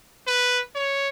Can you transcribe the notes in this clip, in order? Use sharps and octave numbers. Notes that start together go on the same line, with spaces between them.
B4
C#5